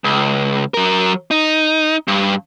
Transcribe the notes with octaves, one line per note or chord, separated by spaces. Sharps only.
C#2
F#3 A#4
D#4
G2